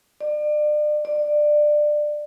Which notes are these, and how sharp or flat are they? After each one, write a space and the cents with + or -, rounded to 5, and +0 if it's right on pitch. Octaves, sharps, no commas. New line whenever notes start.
D5 +35
D5 +20